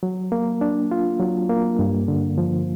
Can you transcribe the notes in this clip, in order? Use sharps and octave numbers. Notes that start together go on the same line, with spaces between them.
F#3
A#3
D4
F4
F#3
A#3
G2
D3
F3